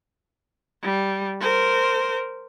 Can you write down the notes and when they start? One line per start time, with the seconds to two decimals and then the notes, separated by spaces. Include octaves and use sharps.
0.83 G3
1.41 A#4 C5